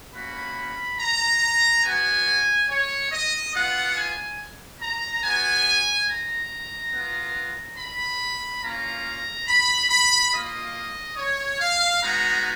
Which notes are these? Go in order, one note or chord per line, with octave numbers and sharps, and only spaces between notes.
A#3 C#4 F#4 B5
A#5
B3 F#4 G#5
C#5
D#5
B3 F4 F#5
G#5
A#5
B3 F#4 G#5
A#5
B3 F4
B5
A#3 C#4 F4 A#5
B5
B5
A#3 F4 D#5
C#5
F5
G#3 B3 D#4 F#4 A#5